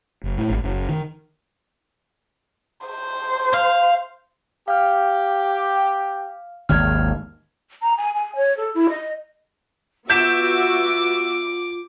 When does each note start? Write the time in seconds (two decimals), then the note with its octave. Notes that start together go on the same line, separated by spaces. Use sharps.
0.24 F#1
0.38 A2
0.50 G#1
0.64 F#1
0.89 D#3
2.86 C5
3.54 F5
4.68 G4 F5 F6
6.69 G#1 D#2 F6 G#6
7.82 A#5
7.98 G#5
8.16 G#5
8.36 C#5
8.57 A4
8.75 E4
8.90 D#5
10.10 B3 F4 F#4 E5 D6 G6 B6 E7